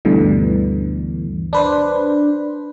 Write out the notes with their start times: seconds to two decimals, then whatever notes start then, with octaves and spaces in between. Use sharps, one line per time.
0.05 D2 G2 B2 D3 E3
1.53 D4 B4 C5